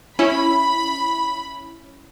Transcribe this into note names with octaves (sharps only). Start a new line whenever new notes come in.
C#4 E4 B5